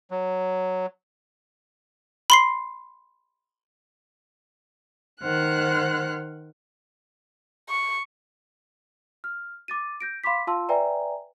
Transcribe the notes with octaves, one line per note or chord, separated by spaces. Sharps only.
F#3
B5 C6 C7
D#3 C5 F#5 F6 F#6
C#6
F6
D6 A6 D#7
G6 A#6 D7
F5 B5 C6 D6 B6
F4 F5 A5 C6 E6
B4 D5 E5 G5 G#5 A#5